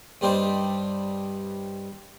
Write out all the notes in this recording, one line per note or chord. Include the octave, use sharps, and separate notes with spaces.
G2 G3 C4 D4 D#4